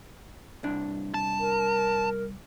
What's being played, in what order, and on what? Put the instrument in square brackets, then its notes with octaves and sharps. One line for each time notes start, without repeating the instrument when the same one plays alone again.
[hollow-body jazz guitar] C2 D4
[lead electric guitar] A5
[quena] A#4